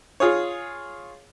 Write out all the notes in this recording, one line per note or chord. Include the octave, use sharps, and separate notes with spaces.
F4 G#4 C#5